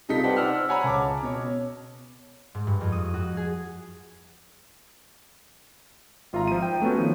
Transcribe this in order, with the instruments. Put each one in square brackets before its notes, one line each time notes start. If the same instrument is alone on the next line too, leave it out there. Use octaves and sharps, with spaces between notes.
[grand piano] C3 G3 D#4 F4 A4 B6
B4 C5 D5 F#5 G5 A5
C5 D5 F#5 E6 F6
C#5 F#5 G#5 A#5 B5
C#2 A5 D6
B2 C#5
[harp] G#2
G2
F2
D#6
F#4
G#4
[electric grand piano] G#1 F4 E5 A#5
F3 D#7
G5
A3 B3 C#4 F#4
D#3 F3